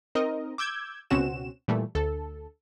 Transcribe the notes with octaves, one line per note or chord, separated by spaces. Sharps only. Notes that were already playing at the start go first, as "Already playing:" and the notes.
C4 D#4 A#4 D#5
D6 E6 G6 G#6
C#2 B2 C4 C#4 F#4 E7
A#2 E3 G3 A3
D2 A4